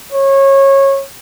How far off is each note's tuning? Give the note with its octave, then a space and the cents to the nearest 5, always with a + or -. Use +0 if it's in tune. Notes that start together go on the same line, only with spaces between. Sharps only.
C#5 -20